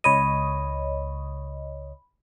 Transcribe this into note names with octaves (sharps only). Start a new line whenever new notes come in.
C#2 C#5 D#5 B5 D#7